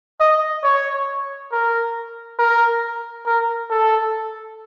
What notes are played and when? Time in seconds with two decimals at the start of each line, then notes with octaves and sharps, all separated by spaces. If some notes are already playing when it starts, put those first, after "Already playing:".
0.20 D#5
0.64 C#5
1.52 A#4
2.39 A#4
3.26 A#4
3.71 A4